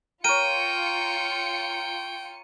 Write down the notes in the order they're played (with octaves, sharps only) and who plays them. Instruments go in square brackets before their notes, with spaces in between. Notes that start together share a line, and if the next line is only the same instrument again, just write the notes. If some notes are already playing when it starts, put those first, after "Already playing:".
[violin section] F4 C#7 [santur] A#4 C#5 [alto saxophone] G5 [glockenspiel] D#7